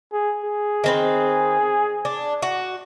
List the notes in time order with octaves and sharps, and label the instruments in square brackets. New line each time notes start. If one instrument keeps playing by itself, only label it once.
[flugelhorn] G#4
G#4
[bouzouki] D#3 C4 B4
D4
F#4